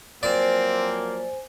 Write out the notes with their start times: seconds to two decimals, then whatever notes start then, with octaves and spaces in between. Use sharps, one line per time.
0.23 F3 F#3 A#3 C4 C5 D5 G#5